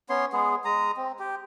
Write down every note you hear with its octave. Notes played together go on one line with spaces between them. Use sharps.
B3 C#4 C#5 C6
G#3 B3 G#4
G#3 A#5 D#6
C4
G4